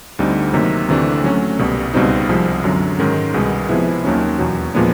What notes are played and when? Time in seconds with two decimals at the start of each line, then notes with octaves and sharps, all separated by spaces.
0.19 D2 D3 G3 C4 D#4
0.53 C3 D#3 F#3 A#3 D#4
0.89 D2 C3 E3 A3 D4
1.24 F#3 A3 C#4 F#4
1.59 C2 B2 G3
1.94 C#2 B2 G3 C4 D#4
2.29 C2 C3 F3 G#3
2.64 F#2 D3 F#3
2.99 G#2 D#3 G#3 C#4
3.34 C2 B2 G#3 B3
3.69 C3 F3 G#3 B3 E4
4.04 D#2 D#3 F#3 A#3 C#4
4.39 E2 B2 F#3
4.74 A#2 F3 G#3 B3 D4